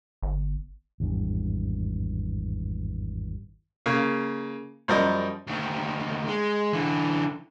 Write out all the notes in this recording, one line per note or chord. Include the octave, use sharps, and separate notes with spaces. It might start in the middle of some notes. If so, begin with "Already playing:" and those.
G1
G#1 E2 G2
C#3 A#3
F#2 F3 G3 A#4 D#5
D2 D#3
G#3
D3 E3